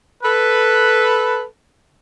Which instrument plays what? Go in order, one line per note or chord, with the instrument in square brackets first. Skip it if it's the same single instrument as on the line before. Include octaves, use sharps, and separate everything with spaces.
[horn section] A4 B4